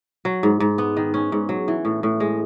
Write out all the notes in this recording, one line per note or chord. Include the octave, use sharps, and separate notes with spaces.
F#3
G#2
G#2
B3
D#3
C#4
G#2
F#3
E3
A2
A2
G#3